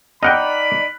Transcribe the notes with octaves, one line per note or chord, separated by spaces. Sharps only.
D#4 D5 D#5 F#5 G5 B5 F6 F#6